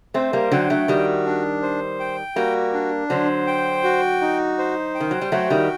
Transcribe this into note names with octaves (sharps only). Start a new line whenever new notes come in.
A3 C4 C5
G3 A#3
D3 F#3 G5
F#3 A3
D#3 G3 F#4
D4
C5
G5
G3 A#3 F#4
D4
D3 F#3 C5
G5
F#4
D#4
C5
G5
D#3
F#3
G3
F#3 A3 F#4
D#3 G3